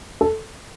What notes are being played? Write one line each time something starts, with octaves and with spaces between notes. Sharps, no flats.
A4